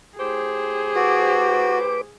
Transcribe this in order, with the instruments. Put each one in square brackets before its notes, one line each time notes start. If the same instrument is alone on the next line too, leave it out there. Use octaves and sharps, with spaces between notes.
[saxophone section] A2 G4 C5 [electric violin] G#4
[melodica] F#4 [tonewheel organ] B4 D6